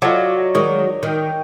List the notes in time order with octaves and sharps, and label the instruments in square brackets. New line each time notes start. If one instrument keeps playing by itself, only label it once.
[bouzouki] F#3 [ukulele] F4 A4 F#5 [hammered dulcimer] D5 D#5
[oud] D#3 G#3 [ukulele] D#4 [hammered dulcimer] C#5
[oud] D#3 [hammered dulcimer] D#5 G5